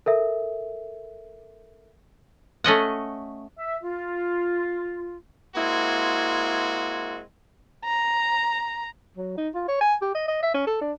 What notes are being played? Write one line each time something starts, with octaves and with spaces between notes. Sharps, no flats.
A4 A#4 E5
A3 C#4 D#5 F#5
E5
F4
G#3 A#3 C4 E4 F#4
A#5
F#3
D#4
F4
C#5
G#5
G4
D#5
D#5
E5
C#4
A4
D4